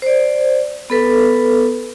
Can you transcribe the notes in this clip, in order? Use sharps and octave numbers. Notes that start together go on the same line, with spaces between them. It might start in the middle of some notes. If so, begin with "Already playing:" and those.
C5 D5
B3 A4 B4